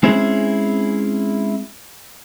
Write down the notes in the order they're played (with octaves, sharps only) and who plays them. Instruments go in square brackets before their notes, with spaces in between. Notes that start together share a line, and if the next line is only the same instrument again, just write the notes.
[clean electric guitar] G#3 C4 C#4 E4 G#4